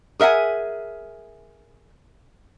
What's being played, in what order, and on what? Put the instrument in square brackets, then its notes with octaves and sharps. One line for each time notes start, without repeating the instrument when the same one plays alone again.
[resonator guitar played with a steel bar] G#4 A#4 E5 F#5 G#5